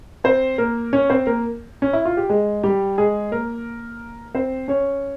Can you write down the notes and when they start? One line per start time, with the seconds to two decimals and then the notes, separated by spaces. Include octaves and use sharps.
0.24 C4 C5
0.58 A#3 A#4
0.93 C#4 C#5
1.10 C4 C5
1.27 A#3 A#4
1.82 C#4
1.93 E4
2.05 F4
2.17 G4
2.29 G#3 G#4
2.63 G3 G4
2.98 G#3 G#4
3.32 A#3 A#4
4.35 C4 C5
4.68 C#4 C#5